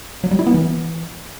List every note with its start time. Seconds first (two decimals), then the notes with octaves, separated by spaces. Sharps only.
0.24 F#3
0.31 G3
0.39 E4
0.47 B3
0.54 E3